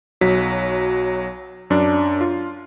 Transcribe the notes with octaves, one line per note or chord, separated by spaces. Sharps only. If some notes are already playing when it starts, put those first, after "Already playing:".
B1 F#3 B6
F#2 D4
F4